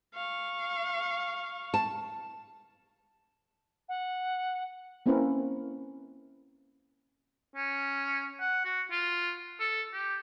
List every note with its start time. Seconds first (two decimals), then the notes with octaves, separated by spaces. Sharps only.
0.15 F5 C#6
1.74 A5
3.89 F#5
5.06 A#3 C4 C#4 E4 A#4 B4
7.55 C#4
8.40 F#5
8.65 F#4
8.91 F4
9.60 A4
9.93 G4